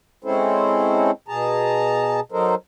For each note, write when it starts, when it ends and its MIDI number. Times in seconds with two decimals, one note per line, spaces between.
0.24 1.11 56
0.24 1.11 60
0.24 1.11 61
0.24 1.11 64
0.24 1.11 69
0.24 1.11 72
1.28 2.20 47
1.28 2.20 68
1.28 2.20 81
1.28 2.20 82
2.32 2.55 54
2.32 2.55 63
2.32 2.55 69
2.32 2.55 70
2.32 2.55 72